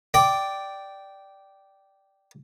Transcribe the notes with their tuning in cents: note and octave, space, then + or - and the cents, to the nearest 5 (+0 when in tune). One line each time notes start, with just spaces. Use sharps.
D5 +0 G5 -10